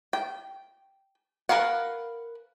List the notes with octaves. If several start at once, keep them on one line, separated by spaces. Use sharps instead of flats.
G5
A#4 B4 F5 F#5